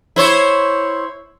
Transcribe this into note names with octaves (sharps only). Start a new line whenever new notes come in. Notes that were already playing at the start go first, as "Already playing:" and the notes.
E4 C5 C#5